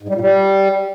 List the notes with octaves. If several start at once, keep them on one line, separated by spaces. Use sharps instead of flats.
G#2
G3
A#2
G3